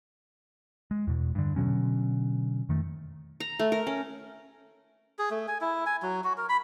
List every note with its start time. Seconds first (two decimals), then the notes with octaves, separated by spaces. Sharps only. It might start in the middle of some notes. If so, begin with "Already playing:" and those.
0.91 G#3
1.07 E2 B2
1.35 G2 D3
1.56 B2 D3 F#3 C#4
2.69 F2 D#3 A3
3.40 A#5
3.59 A3
3.72 A#4
3.87 C#4
5.19 G#4
5.31 A3
5.48 G#5
5.61 E4
5.86 G#5
6.03 F#3
6.24 F#4
6.38 A#4
6.49 B5